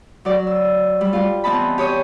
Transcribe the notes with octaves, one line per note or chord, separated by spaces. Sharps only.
F#3 D5
E6
G3
G3 F4
E3 B3 C4 D#5 A5 B5
G4 C#5 D#6